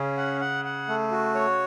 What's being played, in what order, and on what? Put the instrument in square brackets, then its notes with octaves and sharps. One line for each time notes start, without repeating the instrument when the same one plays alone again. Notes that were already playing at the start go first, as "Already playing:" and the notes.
Already playing: [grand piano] C#3 [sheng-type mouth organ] C#4
[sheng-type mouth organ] F#5
F#5
F#5
A3
F#4
C#5